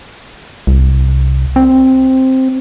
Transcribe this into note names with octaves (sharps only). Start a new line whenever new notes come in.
C2
C4